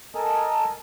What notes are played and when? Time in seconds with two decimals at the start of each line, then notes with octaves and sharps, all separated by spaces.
0.15 A4 A#4 D#5 G#5 A5 D#6